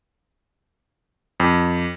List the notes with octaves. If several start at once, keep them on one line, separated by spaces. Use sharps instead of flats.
F2